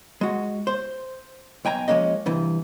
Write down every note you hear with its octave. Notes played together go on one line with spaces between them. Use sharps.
G#3 F#4
C5
B1 G5 G#5 A#5
F3 G#3 A#3 C#4 D#5
G2 C3 E3